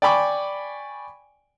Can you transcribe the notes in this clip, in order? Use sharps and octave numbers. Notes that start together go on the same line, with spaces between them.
D5 G5 G#5 B5 C#6 D6